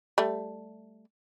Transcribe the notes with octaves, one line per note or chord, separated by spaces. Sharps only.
G3 A3